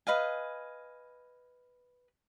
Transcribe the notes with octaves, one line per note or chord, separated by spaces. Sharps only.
B4 D#5 F5 G#5